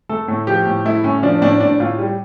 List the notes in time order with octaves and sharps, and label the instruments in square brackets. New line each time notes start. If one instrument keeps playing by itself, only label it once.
[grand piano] A3 A4
A2
F3 G4
A2
A3 E4
A2 C#4
F3 D4
A2 D4
A2 D4
A2 F4
G3